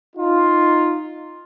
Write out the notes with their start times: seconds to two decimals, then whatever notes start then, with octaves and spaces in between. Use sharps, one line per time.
0.16 D#4 F4